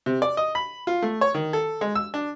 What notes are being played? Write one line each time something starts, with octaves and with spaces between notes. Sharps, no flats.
C3
D5
D#5
B5
F4
A3
C#5
D#3
A4
G#3
E6
D4